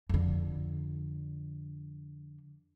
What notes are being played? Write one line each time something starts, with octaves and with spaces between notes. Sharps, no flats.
F2 D3